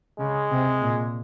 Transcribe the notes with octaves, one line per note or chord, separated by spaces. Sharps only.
C#3 G#3
C3
A#2